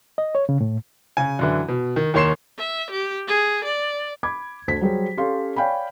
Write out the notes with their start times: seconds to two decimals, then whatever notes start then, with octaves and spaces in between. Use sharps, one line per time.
0.18 D#5
0.35 C#5
0.49 C#3
0.61 A2
1.17 C#3 G#5
1.39 F#2 D3 E3
1.68 B2
1.96 D#3
2.14 D#2 D#3 C#5 C6 C7 E7
2.58 E5
2.91 G4
3.28 G#4
3.64 D5
4.23 B5 D6 G#6
4.68 D2 D3 C5 B6
4.81 F#3 G3 G#4 C5
5.17 C#4 G4 A4 C#5 F5 C6
5.56 C#5 D5 F5 G5 G#5 B5